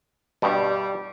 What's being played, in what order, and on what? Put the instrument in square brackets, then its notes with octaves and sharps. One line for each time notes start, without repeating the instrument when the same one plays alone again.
[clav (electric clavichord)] G2 B2 [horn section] G3